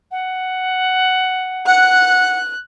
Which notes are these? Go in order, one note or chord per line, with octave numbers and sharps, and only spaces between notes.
F#5
F#5 F#6